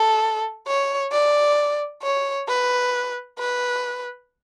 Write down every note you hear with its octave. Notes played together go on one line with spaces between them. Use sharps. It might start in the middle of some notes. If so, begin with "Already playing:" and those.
Already playing: A4
C#5
D5
C#5
B4
B4